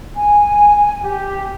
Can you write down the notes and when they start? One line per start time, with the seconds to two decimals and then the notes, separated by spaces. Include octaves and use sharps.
0.15 G#5
1.03 G4